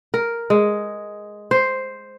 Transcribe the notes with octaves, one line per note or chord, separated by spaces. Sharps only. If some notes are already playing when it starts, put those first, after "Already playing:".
A#4
G#3
C5